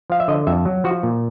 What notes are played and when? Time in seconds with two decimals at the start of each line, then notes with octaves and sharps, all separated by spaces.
0.10 F3 F5
0.20 E5
0.28 D3 D#5
0.47 F2 E5
0.66 F#3
0.84 F3 F#4
1.03 A#2